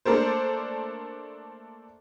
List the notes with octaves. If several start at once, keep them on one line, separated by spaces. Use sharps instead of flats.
A3 A#3 D4 A4 A#4 C5